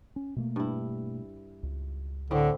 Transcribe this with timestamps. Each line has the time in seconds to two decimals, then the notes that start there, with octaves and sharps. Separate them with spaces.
0.16 C#4
0.36 B2 A3 A#3
0.56 G2 E4
1.63 C#2
2.31 A2 D3 C4 E4